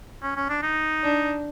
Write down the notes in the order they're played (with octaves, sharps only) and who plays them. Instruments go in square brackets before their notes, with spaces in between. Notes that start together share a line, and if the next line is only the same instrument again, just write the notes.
[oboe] C#4
C#4
D4
D#4
[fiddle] D4